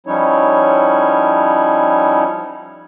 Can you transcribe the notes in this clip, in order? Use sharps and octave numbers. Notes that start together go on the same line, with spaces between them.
F3 G3 C#4 D#4 E4 C#5